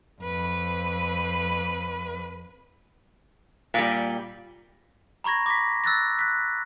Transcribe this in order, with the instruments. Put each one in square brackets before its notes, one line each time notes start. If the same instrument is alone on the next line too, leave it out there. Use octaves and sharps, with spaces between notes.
[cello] F2 B4
[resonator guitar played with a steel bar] A#2 G3
[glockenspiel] A#5 B5 C#6 G#6 A#6
D6 A#6 B6
E6 F#6 A6 A#6
F#6 B6